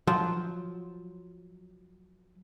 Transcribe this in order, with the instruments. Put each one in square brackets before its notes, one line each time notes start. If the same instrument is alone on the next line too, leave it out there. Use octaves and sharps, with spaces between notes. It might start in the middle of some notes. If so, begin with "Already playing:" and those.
[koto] F3 [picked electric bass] F#3